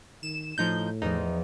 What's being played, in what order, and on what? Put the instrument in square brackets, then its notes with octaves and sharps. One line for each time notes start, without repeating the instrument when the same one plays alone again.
[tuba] D#3 [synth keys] E7
[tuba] A2 [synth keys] F3 D#4 G6
[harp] E2 F3 [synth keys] D#4